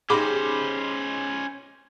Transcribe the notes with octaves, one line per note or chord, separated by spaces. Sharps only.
C#4 D#4 G4 G#4 C5 B5 C6 D6